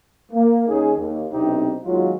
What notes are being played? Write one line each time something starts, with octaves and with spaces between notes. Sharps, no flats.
A#3
D#2 C#4 D#4 G#4
D#2
B1 C3 C4 D4 D#4 G4
D#2 F#3 G#3 F4